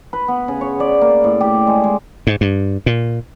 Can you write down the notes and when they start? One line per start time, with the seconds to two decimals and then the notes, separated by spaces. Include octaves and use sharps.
0.13 B4
0.28 B3
0.48 C#3
0.61 C#5
0.80 D5
1.01 A#3
1.24 A2
1.41 G4
1.55 D5
1.67 G#3
1.84 G#3
2.27 G#2
2.41 G2
2.86 A#2